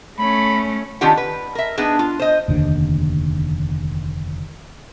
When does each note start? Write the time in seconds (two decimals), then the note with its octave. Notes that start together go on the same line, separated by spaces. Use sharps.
0.19 A3 C#4 B5
1.01 D#3 C#4 D4 F4 G4 F#5
1.17 B4
1.55 A#4 E5
1.77 B3 D4 D#4 G#4
1.99 F4
2.19 C5 D#5
2.48 F1 D#2 A#2 D3